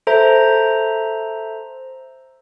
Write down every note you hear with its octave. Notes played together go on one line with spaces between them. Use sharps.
A4 C5 E5 A#5